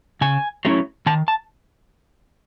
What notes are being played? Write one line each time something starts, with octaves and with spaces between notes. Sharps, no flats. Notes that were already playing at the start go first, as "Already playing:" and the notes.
C#3 G#5
F#3 A3 C#4 E4
D#3 A5
A5